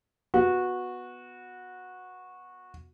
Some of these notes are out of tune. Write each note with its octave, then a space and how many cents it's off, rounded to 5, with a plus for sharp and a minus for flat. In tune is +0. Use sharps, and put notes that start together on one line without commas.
B3 +0 F#4 -15